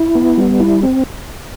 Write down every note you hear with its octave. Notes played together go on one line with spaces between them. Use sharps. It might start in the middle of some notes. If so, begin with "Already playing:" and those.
Already playing: E4
B3
G3
E4
C4